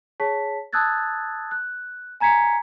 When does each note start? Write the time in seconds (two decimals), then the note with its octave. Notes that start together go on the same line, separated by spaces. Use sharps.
0.20 G#4 C#5 A5 B6
0.73 A5 D#6 E6 F#6 G#6 A6
1.51 F#6
2.20 G#5 A#5 G#6 B6 C#7